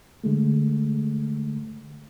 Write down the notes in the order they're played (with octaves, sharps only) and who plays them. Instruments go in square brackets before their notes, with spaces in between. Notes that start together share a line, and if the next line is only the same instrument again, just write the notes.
[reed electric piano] D3 G#3 A3